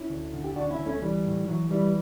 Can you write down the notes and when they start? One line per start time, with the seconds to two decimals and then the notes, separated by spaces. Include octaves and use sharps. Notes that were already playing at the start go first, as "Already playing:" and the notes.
Already playing: C#4 E4
0.10 D2
0.33 D3
0.44 G4
0.56 D2 D4 F#4
0.71 C#4 E4
0.79 D2
0.86 A3 C#4
1.02 E3 G3
1.25 A2
1.47 E3 F#3
1.70 E3 G3